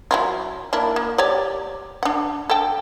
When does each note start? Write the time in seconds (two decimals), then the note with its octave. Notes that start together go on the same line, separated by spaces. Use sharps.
0.11 F#3 E4 F4
0.73 A#3 D4 E4
0.96 A#3
1.18 G4 C#5 D5
2.03 D4 F#5
2.50 A4 G5